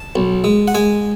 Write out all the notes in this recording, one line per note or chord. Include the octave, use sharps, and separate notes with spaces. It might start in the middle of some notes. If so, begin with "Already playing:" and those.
Already playing: A5
B1
G#3
F#5
G#3 G#5